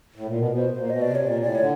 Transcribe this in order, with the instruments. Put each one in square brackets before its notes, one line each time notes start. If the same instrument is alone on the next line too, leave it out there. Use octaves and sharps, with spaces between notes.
[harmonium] A2
A#2
[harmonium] B2 [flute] A#4
[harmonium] B2 [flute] C5
[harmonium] A#2 [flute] C5
[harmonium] B2 [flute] D#5
[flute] D5
[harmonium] C3
[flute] C#5
[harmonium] A#2 [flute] D5
[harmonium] A2 [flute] D5
[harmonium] D3 [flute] C#5